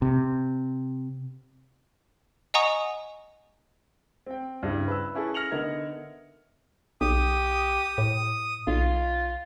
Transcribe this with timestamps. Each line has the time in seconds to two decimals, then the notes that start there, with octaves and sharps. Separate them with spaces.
0.02 C3
2.54 D#5 F#5 G#5 A#5 C#6 D#6
4.26 C4 G5
4.63 G2 C#3 C4 E4
4.88 B4 E6
5.15 C#4 E4 G#4 A4 B4
5.34 F6 A#6 C#7 F7 F#7
5.51 D3 B3 D#4 A#4 E5 G#6
7.01 B1 G4 D#6
7.98 A2
8.67 B1 F4